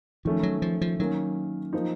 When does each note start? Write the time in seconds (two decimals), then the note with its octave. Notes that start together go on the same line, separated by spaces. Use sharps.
0.25 D#3 F3 A3 C#4
0.43 F#3
0.62 F3
0.81 F3
0.99 D#3 F#3 A#3 C#4
1.73 F3 A#3 D#4